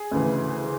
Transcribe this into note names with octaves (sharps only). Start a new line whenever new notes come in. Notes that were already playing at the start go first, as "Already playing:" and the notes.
Already playing: G#4
D2 C#3 E3